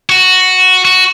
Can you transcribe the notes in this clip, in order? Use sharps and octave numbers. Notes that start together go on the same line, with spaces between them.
F#4
F#4